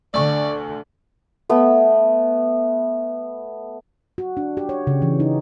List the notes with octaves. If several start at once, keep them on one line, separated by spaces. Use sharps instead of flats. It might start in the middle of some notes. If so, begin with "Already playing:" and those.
D2 D3 D5 C#6
A3 B3
F#4
D4
G4
C#5
C#3
E3
D#4